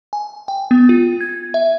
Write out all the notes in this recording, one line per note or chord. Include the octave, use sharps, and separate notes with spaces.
G#5
G5
B3
F4
G#6
E5